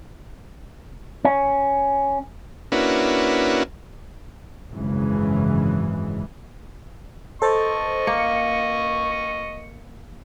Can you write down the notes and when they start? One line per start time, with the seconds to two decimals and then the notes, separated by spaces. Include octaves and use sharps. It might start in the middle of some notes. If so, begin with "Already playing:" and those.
1.25 C#4
2.72 A#3 C#4 D4 E4 F#4 B4
4.72 G#1 F#2 C#3 E3 G#3
7.42 A4 C5 D#5 C#6 A6
8.07 A#3 C#7